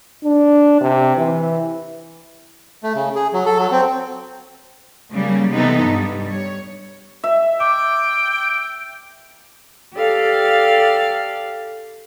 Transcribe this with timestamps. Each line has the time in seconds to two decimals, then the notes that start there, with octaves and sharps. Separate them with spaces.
0.24 D4
0.81 C3
1.17 E3
2.83 A3
2.95 C#3
3.15 G#4
3.33 F#3
3.46 A4
3.58 F#3
3.72 C4
5.13 C#3 F#3 G3 A#3
5.52 C3 E3 B3 D#4 A4
5.84 G2 G3
6.29 C#5
7.24 E5
7.60 G5 D6
9.95 G4 A4 D5 F5